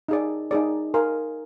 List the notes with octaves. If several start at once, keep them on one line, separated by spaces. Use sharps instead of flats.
D#4 G#4 D5
D#4 G#4 D5
A#4 F5 G#5 C6